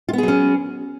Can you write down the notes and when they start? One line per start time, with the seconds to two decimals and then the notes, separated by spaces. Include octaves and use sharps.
0.08 F4
0.13 B3
0.18 G#4
0.23 F#3
0.28 C#4